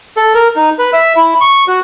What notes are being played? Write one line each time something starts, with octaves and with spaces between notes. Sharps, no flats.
A4
A#4
D#4
B4
E5
E4
C#6
F#4